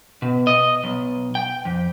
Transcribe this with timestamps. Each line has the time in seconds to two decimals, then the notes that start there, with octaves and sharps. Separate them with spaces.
0.22 B2
0.47 D#5
0.84 B1
1.35 G5
1.65 F2